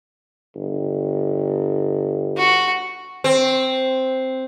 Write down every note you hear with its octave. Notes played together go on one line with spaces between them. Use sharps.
G1
F#4
C4